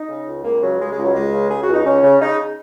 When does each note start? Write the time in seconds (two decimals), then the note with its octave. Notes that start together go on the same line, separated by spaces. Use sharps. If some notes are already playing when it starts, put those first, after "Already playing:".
Already playing: D#4
0.08 C#3
0.26 C#2
0.44 C#2 A#3
0.61 C#3 F#3
0.79 C#3 G#3
0.91 G#3
0.97 C#2
1.03 F#3
1.14 C#2 G#3
1.32 C#3
1.49 C#3 G#4
1.62 F#4
1.68 C#2
1.74 D#4
1.85 C#2 C#4
2.03 C#3
2.20 C#3 D#4